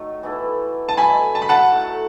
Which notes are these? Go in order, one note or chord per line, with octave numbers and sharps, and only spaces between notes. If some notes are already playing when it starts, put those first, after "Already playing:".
Already playing: D#3 F#3 A3
E3 B3 E4 A4
A5
B2 F#3 A3 G#5 B5
A5
B5
F#5 A5
A2 F#3 A3